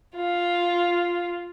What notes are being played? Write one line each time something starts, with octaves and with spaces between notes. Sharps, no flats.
F4